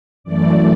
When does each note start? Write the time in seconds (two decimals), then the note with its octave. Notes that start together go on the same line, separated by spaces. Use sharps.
0.24 F#2 E3 A3 D5